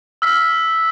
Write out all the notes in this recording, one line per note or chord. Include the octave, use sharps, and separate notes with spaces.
E6 F6 B6